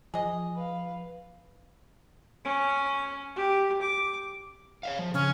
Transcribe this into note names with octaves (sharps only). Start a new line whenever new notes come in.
F3 G#4 D#5
B4 F5
C#4
G4
D6
C#5 E5 F5
F3
C#3 C#4